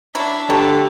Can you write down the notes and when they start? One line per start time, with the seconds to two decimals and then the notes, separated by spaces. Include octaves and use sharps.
0.15 F#3 D4 E4 E5
0.50 D3 F#3 A3 G4